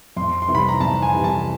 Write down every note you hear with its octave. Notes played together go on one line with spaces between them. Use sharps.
F2 C6
C6
C3 E3 G3
B5
A#5
F2 A5
G#5
C3 E3 G3
A5